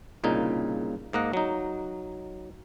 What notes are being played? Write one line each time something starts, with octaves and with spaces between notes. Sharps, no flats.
C2 A#2 C#3 D#4
G#2 A#3 D#5 F#5
F#3 D#4